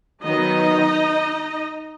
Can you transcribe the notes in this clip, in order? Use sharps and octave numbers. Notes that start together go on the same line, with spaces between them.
D#3 F#3 B3 D#4 D#5